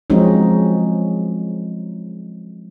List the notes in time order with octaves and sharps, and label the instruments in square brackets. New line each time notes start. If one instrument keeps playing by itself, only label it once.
[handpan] F3 F#3 G#3 C4 C#4 D#4